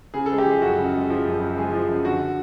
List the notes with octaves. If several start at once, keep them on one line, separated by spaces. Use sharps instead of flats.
C#3 G#4
A4
G#3 G#4
G4
F3 G#4
F#2 F#4
C#3
G#3
F3
F#2
C#3
G#3 G#4
F3
F#2
D3 F#4